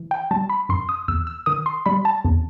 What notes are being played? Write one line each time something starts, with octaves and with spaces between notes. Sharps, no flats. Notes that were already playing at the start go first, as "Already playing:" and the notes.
Already playing: E3
G5
G3 A5
B5
F#2 C6
D#6
E2 E6
E6
D#3 D#6
C6
G3 B5
A5
E2